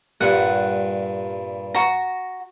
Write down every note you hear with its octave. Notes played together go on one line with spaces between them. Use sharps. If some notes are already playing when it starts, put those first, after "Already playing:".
G2 A#2 G3 F#5
F#4 A#5